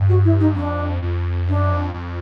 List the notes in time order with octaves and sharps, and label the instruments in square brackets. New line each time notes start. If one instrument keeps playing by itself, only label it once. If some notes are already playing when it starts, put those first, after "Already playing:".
Already playing: [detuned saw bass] G2
[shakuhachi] F#4
E4
D#4
[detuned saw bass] F2 [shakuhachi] D4
[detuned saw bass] F2
[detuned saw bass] F#2 [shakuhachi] D4
[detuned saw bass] F2
F2